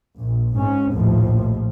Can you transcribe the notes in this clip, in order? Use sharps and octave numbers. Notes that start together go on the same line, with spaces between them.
A#1
G#2 C#4
A#1 D#2 A2 F3